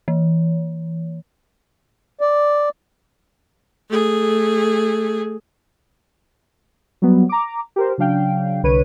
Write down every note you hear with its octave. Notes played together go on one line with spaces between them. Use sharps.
E3
D5
A3 G#4
F#3 G3 B3
A#5 D6
G4 A#4 C5
C#3 F#3 D4 F5 G5
C2 D3 B4 C#5 D#7